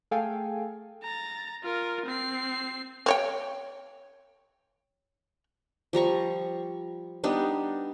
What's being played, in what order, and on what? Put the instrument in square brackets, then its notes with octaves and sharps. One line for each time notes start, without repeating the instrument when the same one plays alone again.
[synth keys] A3 G#4 A4 F5 G5 G#5
[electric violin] A#5 A6
F4 A#4
C4 C7
[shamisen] C4 C#5 G5
[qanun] F3 G3 A#5 C#6
G3 B3 D4 D#4